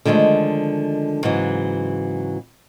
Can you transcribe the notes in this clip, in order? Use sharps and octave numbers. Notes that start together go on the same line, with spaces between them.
D3 D#3 F3 G#3 A3
G#2 C#3 E3 F#3